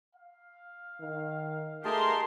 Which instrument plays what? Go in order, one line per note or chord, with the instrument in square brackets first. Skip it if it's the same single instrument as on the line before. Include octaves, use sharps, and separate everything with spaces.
[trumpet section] F5
[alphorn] D#3
[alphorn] A3 [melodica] D#4 G#4 A5 [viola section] G4 A#4 C6